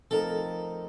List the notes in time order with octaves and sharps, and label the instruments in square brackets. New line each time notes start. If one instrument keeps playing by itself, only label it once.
[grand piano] F3 A3 C4 D#4 A#4 [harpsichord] A4